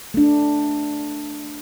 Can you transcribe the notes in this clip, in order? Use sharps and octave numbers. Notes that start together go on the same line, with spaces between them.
A3 D4